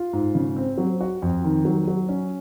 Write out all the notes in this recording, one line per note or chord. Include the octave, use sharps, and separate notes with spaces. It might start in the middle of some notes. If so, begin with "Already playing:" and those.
Already playing: F4
G#2
C#3
C4
F#3
F#4
F2
D#3
F#3
F#3
C#4